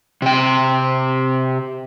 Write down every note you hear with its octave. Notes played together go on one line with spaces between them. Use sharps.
C3 G5